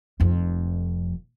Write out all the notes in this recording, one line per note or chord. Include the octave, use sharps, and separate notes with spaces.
F1 F2